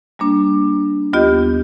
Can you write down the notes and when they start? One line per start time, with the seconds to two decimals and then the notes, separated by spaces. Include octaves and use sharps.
0.19 G3 A#3 D4
1.13 D#2 B3 F4 G4 D#5 G6